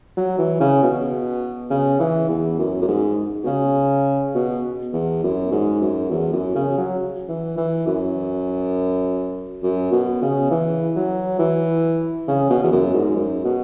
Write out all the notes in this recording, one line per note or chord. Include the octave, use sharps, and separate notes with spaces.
F#3
E3
C#3
B2
C#3
E3
E2
F#2
F#2
G#2
B2
C#3
B2
E2
F#2
G#2
F#2
E2
F#2
C#3
F#3
E3
E3
F#2
F#2
B2
C#3
E3
F#3
E3
C#3
B2
E2
F#2
G#2
F#2
B2